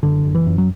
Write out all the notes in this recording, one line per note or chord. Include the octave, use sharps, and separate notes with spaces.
F#1 D3
F#1
E3
F#2
F#3